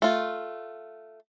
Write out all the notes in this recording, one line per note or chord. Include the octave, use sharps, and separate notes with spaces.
A3 F4